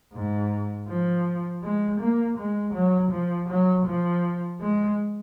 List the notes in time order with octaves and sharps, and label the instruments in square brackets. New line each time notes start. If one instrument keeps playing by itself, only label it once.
[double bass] G#2
F3
G#3
A#3
G#3
F#3
F3
F#3
F3
G#3